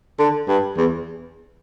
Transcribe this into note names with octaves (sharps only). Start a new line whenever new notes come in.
D3
G2
E2